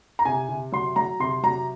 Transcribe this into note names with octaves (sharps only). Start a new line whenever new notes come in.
A#5
C3 G#5
C3
F#3 C6
F#3 A#5
C3 C6
F#3 A#5